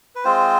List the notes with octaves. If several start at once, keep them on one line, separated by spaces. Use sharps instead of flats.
B4
G#3 C4 F4 C5